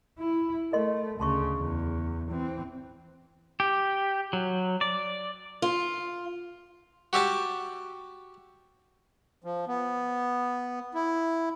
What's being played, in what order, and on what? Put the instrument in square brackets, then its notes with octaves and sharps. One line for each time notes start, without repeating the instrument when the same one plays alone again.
[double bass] E4
[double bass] A3 [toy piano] A#4 D#5 C6
[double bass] D2 C#3 [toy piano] A5 C6 C#6
[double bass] E2
E3 C4
[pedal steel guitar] G4
F#3
D5
[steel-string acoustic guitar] F4
[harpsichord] F#4 G4 E5 A5
[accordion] F3
B3
E4